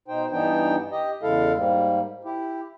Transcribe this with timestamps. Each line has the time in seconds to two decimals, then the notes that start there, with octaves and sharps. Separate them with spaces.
0.08 B2 D#4 C5 G5
0.32 G2 E3 B3 D4 D#4 G5
0.91 G4 D#5
1.22 E2 C#3 G#3 E4 A4 F5
1.56 G#2 G3 A#3
2.24 E4 G4